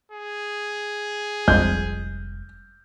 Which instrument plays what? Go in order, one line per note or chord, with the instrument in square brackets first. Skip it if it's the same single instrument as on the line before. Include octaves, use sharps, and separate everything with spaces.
[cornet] G#4
[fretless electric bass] F1 G3 [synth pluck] A#1 F2 G#3 [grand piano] G6